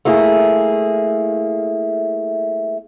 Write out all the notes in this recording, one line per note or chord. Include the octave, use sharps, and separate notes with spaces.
A3 A#3 E4 G#4